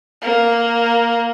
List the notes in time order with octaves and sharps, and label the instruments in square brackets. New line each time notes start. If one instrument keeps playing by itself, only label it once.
[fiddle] A#3